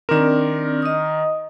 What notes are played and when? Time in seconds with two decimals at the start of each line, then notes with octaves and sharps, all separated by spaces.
0.09 D#3 C4 D4 A#4 D5
0.82 D#5 D#6